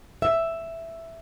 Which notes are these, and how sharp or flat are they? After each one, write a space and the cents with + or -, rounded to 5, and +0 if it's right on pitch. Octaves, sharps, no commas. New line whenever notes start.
E5 +5